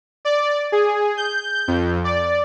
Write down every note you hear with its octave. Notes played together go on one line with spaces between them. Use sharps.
D5
G#4
G6
F2
D5